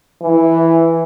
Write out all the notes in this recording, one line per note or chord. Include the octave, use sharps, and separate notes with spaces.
E3